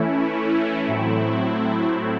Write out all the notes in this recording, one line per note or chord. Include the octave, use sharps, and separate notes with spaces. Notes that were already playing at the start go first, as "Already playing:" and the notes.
Already playing: E3 A3 C#4 E4
A2 F#3 A3 C4 E4